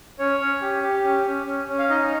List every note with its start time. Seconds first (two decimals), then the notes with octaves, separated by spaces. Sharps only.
0.19 C#4 C#5
0.40 C#4
0.61 G4
0.82 G4
1.04 C#4
1.26 C#4
1.46 C#4
1.68 C#4
1.79 F5
1.90 D#4 D#5